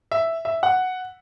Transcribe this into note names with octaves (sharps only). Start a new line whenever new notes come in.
E5
E5
F#5